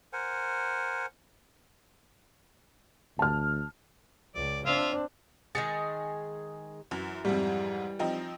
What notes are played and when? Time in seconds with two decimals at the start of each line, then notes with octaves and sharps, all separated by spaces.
0.13 A#4 C5 F#5 G#5
3.19 D2 A5 F6
4.35 C#2 D5
4.66 C4 D4 F4 E5 F5
5.55 D#3 G#3 G#4 A6 C#7
6.91 F#2 E3
7.25 F2 G#2 G3
7.99 F3 C4 D#4